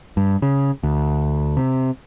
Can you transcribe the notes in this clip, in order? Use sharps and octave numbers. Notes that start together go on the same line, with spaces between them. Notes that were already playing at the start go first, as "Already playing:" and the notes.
G2
C#3
D2
C3